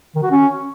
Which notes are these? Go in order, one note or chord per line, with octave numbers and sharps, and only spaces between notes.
D#3
F#4
C#4